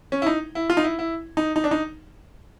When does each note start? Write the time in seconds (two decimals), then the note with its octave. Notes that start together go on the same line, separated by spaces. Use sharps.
0.12 C#4
0.22 E4
0.26 D#4
0.55 E4
0.70 F4
0.77 D#4
0.84 E4
0.99 E4
1.37 D#4
1.56 D#4
1.64 D4
1.71 D#4